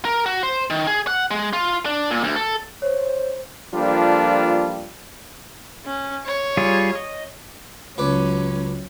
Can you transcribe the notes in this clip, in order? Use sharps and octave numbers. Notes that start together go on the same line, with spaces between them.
A#4
F#4
C5
D#3
G#4
F#5
G#3
F4
D4
A#2
D2
A4
C5 C#5
F3 G3 A#3 D4 F4 A4
C#4
C#5
G3 F4 G#4
D#5
C#2 F#3 C#4 B4 D6